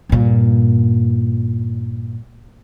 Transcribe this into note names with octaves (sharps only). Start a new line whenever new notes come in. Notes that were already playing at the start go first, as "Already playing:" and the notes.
G2 A#2